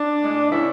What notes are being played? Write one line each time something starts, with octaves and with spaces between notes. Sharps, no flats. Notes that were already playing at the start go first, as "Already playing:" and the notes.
Already playing: D4
A2 G#3
C#3 E3 E4